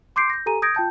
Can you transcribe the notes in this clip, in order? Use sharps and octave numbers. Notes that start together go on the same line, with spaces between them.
C6 D6 G6 C7 D7
G6 A#6
G4 A4 G#5 A#5 D#7
D#6 G6 G#6 A#6 D7
F4 G5 A5 G6